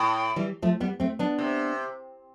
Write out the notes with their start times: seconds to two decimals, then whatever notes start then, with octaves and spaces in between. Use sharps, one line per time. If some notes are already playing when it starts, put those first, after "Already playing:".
Already playing: A2
0.36 E3 G3
0.62 F3 A3
0.80 G3 B3
1.00 A3 C4
1.19 B3 D4
1.39 C3